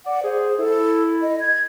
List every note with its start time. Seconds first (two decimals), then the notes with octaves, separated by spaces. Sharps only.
0.06 D5 F#5
0.24 G#4 C5
0.58 E4 A4
1.22 D#5
1.41 G#6